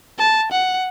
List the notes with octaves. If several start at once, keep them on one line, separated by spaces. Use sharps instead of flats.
A5
F#5